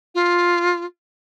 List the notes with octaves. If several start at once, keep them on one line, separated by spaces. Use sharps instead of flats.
F4